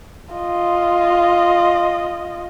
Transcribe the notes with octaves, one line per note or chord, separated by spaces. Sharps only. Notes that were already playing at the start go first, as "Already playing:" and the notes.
F4 D#5